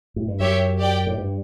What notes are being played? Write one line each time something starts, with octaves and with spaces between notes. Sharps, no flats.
A2
G2
F#2 G4 C#5 E5
G4 D5 G5
A2
G2